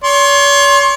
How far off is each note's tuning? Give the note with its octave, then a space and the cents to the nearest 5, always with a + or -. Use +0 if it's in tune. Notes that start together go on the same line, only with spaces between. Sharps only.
C#5 +40 C6 +30